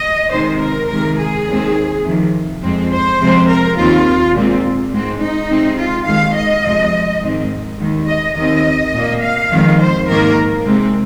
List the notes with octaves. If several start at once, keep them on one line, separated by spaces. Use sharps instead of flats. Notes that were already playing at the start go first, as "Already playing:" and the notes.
Already playing: D#5
C3 D#3 G#3 C4 C5
A#4
C3 D#3 G#3 A#4
G#4
D#2 D#3 G#3 C4
F2 C3 D#3
F2 F3 G#3 C4
C5
F2 C3 G#3 C4
A#4
D#2 D#3 C4 F4
A#2 G#3 C4
G#2 G#3 C4
D#4
C3 G#3 C4
F4
D#2 D#3 G#3 F5
D#5
F2 C3 F3 G#3
G#2 D#3 C4
D#2 D#3 G#3
D#5
D#2 D#3 C4 D#5
A#2 A#3
F5
F2 D#3 G#3 C4
C5
G#2 D#3 A#3 A#4
C3 G#3 C4